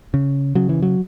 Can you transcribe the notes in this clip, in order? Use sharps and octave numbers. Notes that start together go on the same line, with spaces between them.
C#3
C#3 F#3
E3
F#3